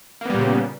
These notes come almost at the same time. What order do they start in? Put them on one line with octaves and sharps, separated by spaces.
A#3 B3 G3 A#2 C#3